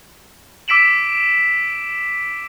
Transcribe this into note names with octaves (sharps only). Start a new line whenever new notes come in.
D6 E6 B6 D7 E7 F#7